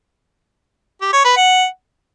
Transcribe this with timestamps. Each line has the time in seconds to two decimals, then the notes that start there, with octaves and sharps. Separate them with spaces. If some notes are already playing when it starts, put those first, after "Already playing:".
1.01 G4
1.13 C#5
1.25 B4
1.36 F#5